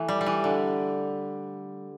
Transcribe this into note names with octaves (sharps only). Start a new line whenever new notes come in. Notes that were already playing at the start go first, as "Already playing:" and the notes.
Already playing: E3 A3
G3
G3
E3
D3